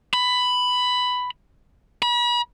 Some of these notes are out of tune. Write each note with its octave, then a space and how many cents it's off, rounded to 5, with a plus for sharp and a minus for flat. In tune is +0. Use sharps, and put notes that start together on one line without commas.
B5 +10
B5 -40